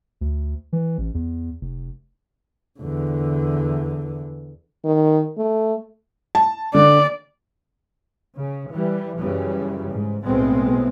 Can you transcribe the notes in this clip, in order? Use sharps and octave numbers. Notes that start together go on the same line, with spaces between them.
D2
E3
A1
E2
F1
E2 D3
D#3
A3
A5
D3 D5
C#3
E3 G3
F#2 C#3 E3 G3
G#2
B1 A2 G#3 B3 C4